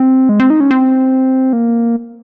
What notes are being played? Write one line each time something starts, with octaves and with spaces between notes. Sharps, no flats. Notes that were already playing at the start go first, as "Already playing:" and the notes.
Already playing: C4
G#3
C4
D#4
C#4
C4
A#3